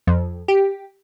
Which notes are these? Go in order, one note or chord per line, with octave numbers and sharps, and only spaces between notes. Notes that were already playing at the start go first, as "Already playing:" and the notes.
F2
G4